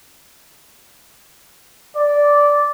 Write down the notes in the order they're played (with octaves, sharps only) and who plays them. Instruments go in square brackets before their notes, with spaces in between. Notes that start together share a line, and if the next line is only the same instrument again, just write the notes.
[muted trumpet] D5